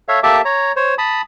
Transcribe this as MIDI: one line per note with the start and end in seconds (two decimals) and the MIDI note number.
0.08 0.20 69
0.08 0.20 73
0.08 0.20 76
0.08 0.20 77
0.23 0.41 58
0.23 0.41 67
0.23 0.41 69
0.23 0.41 76
0.23 0.41 81
0.23 0.41 86
0.45 0.72 73
0.45 0.72 82
0.76 0.95 72
0.76 0.95 73
0.98 1.22 81
0.98 1.22 83
0.98 1.22 87